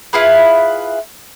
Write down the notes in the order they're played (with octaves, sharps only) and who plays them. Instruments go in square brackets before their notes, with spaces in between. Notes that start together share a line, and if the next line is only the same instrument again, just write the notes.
[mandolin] E4 F4 G#4 B4